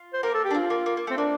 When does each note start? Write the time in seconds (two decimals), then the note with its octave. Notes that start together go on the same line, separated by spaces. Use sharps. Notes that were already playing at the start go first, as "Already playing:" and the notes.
Already playing: F4
0.13 C5
0.23 A#3 A#4
0.34 A4
0.45 G4
0.51 D4
0.54 C4 F4
0.70 A#3
0.86 A#3
0.97 A#3
1.07 A3 C4
1.17 A#3 D4